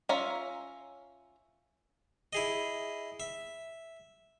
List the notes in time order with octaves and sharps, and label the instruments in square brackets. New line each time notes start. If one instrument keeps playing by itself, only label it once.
[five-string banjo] C#4 F4 E5 F5 A#5
[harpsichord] E4 G#4 D#5
E5